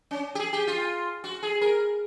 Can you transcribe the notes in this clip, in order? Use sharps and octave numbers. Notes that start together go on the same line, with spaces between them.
C#4
G4
G#4
G4
F4
F#4
G#4
A#4